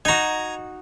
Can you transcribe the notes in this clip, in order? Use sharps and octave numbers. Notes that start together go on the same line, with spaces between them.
D#4 F#4 G#5 A#5